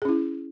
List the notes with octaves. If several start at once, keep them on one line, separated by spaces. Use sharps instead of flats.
C#4 E4 G#4